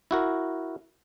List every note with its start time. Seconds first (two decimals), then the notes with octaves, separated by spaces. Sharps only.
0.11 E4 F#4 A#4